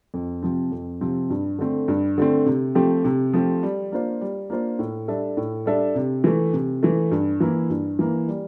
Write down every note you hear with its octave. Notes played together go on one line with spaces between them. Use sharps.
F2
C3 F3 C4
F2
C3 F3 C4
G2
D3 A3 C4
G2
D3 A3 C4
C3
F3 A3 C4 G4
C3
F3 A3 C4 G4
G3
A#3 D4 F4 C5
G3
A#3 D4 F4 C5
A2
G3 D4 A4 E5
A2
G3 D4 A4 E5
C3
E3 A3
C3
E3 A3
G2
E3 A#3 E4
G2
E3 A#3 E4
G3